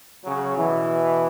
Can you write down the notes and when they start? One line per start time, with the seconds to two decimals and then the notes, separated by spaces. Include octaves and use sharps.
0.25 C#3 F#3
0.57 B2 E3